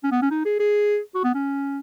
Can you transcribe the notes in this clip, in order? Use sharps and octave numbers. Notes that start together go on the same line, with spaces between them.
C#4
B3
C#4
D#4
G#4
G#4
F#4
B3
C#4